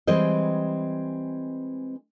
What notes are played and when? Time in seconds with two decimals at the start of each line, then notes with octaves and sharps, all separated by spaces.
0.07 E3 G3 G#3 C4 C5 D#5